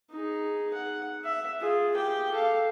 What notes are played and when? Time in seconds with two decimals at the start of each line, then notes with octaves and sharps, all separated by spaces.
0.10 D#4 G#4
0.74 F#5
1.24 E5
1.60 F4 G#4
1.95 G4 G5
2.32 A4 F5